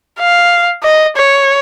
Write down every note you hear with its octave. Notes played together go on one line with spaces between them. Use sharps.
F5
D#5
C#5